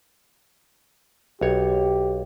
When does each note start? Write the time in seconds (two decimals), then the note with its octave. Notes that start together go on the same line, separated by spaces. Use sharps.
1.41 B1 G4 C#5